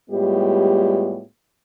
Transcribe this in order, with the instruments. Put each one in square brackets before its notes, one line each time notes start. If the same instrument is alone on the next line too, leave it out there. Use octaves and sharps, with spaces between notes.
[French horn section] A2 G3 G#3 B3 F4 G4